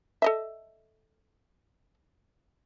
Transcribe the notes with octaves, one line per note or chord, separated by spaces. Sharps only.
A4 D#5 E5